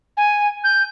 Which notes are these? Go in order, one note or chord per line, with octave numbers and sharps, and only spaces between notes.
G#5
G6